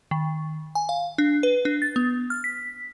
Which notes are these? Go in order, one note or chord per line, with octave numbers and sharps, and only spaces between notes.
D#3
G#5
F5
D4
B4
D4
A6
B3
F6
B6